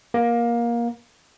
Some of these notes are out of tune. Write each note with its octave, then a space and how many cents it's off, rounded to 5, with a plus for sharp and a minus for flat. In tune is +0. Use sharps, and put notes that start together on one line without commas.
A#3 +20